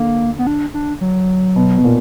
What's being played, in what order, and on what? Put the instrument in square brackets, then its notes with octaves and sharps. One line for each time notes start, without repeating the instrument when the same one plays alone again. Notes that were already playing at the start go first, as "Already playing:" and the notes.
Already playing: [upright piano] D3 [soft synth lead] A#3
[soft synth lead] B3
D4
D4
F#3
[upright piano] B2
B2
A#2